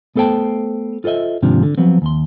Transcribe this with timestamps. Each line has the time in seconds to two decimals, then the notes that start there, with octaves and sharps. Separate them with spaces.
0.15 A3 B3 A4 C5 G5 A5
1.04 F4 A4 C5 D#5 E5
1.43 D#2 G#2 C3 F3 D4
1.63 D3
1.78 F3 F#3 B3 C4
2.02 D#2 C6